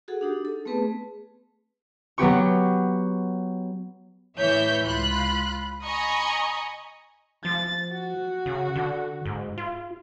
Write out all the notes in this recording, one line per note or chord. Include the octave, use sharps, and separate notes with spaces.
F#4 G#4 A4 F#5
D4 D#4 G4
A4
A3 B3 C4 G#4 B4 A5
F#3 B3 G4 C#6
A2 E3 C#5 E5 G6 B6
C#2 F4 B5 F#6
D#5 G#5 A#5 B5 C#6 D#6
F3 A6
F#4
C#3
D3
G#2
F4